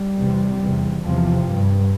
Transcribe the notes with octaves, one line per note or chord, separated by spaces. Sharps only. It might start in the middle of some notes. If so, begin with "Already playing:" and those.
Already playing: G3
E2 C3
E2 C3
E2 C3 F3
G2